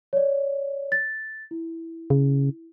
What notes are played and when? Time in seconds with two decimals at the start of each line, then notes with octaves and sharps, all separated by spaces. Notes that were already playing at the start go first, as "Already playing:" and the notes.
0.13 C#5 D5
0.92 A6
1.51 E4
2.10 C#3